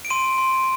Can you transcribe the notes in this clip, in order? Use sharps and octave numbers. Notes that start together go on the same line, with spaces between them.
D7
C6 D#7
C6